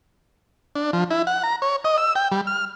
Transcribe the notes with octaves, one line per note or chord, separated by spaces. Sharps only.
D4
F3
E4
F#5
A#5
C#5
D#5
E6
G5
G3
F6